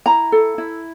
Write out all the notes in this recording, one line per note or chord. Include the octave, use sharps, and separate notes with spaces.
E4 A#5
A4
E4